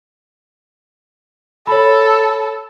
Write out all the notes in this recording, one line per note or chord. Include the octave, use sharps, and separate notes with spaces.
A4 C#5 B5